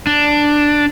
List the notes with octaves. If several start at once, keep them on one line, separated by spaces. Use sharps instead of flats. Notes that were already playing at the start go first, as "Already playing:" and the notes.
D4